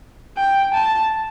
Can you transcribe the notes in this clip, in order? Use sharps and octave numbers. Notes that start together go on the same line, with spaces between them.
G5
A5